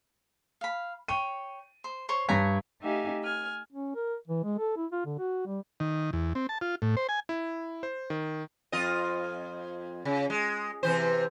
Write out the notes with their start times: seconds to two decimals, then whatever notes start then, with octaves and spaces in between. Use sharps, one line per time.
0.61 F5 B5
1.08 C#5 G5 D#7
1.84 C5
2.09 C5 C#5 C6
2.29 G2 C#5 G#5 A#5 B6
2.81 A3 D#4 G4 E5 F5 G#5
3.22 G#5 F6
3.73 C#4
3.95 A#4
4.28 E3
4.44 G#3
4.58 A4
4.76 E4
4.92 F4
5.05 D3
5.18 F#4
5.46 G3
5.80 D#3
6.13 E2
6.35 C4
6.49 A5
6.61 F4
6.82 A2
6.97 C5
7.09 G#5
7.29 E4
7.83 C5
8.10 D#3
8.72 F2 F4 D#5
10.05 C#3
10.30 G#3
10.83 C3 E3 C5